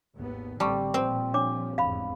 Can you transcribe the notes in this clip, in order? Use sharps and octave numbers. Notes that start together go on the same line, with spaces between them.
G#1 D#2 B3
A1 D3 G3 C4 A5 C#6
A#2 F3 C4
D4 C#5 D6
F1 E2 G#2 F5 B5